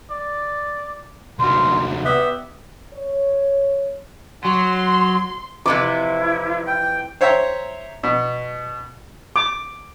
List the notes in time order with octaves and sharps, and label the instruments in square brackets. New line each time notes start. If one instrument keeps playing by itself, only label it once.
[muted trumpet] D5
[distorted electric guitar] C2 F#3 [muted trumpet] A#4 [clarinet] C6
[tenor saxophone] B3 [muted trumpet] G4 [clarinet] E5
[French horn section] C#5
[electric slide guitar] F#3 [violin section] C6
[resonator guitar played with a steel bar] F2 C3 E3 [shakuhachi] E4 [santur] D6
[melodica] G5
[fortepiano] C5 C#5 E5 G5 A#5
B2
[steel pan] D6